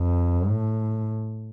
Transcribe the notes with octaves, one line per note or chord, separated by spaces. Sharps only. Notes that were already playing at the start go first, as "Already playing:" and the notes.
Already playing: F2
A2